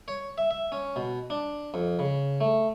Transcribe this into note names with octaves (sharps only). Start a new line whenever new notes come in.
C#5
E5
E5
C#4
B2
D4
F2
C#3
A3